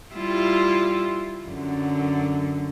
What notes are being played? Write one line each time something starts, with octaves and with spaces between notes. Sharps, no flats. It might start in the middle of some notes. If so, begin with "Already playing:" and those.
G3 E4 F4
F#2 D3